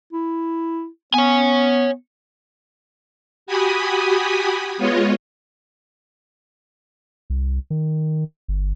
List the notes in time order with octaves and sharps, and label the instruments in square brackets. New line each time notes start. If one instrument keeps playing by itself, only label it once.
[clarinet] E4
[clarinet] B3 [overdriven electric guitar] C#5 G#5
[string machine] F#4 G4 G#5 B5 D#6
G#3 B3 F4 C#5 D#5
[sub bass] C2
D#3
G1